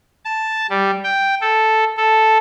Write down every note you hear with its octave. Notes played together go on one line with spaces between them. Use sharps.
A5
G3
G5
A4
A4